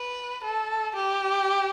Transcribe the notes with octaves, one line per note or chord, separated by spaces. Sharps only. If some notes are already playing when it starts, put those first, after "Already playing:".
Already playing: B4
A4
G4